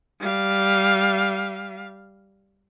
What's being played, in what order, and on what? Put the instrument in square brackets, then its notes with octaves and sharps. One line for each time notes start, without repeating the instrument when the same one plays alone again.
[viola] G3 F5